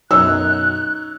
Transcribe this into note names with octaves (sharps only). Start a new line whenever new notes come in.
B1 F#2 D#4 C#5 E6 F#6